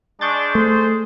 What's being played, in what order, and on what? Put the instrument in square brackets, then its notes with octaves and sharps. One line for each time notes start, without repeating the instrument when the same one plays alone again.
[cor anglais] G#3 [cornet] D4 [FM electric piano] C#6 G6 A6
[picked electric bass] A3 [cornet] C5